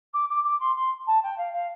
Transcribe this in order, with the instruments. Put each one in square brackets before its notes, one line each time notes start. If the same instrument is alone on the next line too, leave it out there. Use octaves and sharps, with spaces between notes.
[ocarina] D6
D6
D6
C6
C6
A5
G5
F5
F5